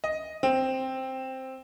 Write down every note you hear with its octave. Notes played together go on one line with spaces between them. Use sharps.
D#5
C4